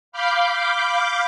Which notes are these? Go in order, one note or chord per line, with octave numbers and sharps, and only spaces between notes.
F5 B5 D6 F6 G6